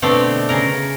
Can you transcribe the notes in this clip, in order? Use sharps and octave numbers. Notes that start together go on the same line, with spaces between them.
B2 D3 A3 C4 D5 F5
C#3 A#4